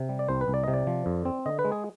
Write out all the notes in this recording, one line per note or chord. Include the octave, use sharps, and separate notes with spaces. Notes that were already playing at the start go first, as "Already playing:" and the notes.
Already playing: C3
G3
D5
C2 C5
B4
C2
D5
C3 D#5
D5
F3
F2
C4
D3 D#5
B4
G#3
G#4